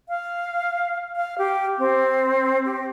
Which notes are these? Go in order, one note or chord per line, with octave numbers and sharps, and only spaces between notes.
F5
F5
G4
C4
G4